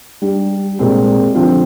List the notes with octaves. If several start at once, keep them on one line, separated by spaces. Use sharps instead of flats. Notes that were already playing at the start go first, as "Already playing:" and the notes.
G3 D4 G4
A#2 G#3 C4 G4
D3 F3 C4 F4